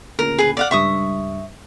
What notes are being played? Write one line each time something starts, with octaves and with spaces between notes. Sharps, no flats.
D2 A#2 C#3 A#4
G#4 B4
D5 F5 F#5
C#2 G2 E5 C#6 D#6